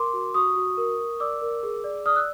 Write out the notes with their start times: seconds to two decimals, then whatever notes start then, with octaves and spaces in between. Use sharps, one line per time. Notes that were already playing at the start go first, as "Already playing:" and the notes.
Already playing: A#4 C6 D6
0.13 F#4
0.34 F#4 C#6 D#6
0.56 F#4
0.77 A#4
0.99 A#4
1.20 D5 D6 E6
1.42 A#4
1.63 G#4
1.84 D5
2.06 D5 D#6 F6
2.16 E6 F#6